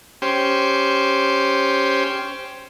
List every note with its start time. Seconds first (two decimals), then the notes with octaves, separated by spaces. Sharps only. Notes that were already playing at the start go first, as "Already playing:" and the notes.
0.22 C#4 G4 C5